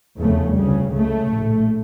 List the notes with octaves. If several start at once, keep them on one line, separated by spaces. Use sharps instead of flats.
F1 E2 C#3 A3
D2 C#3 G3
C#2 C#3 A3
A#1 A2